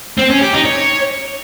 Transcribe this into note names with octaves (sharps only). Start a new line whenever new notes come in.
C4
C#4
G4
D#4
C#5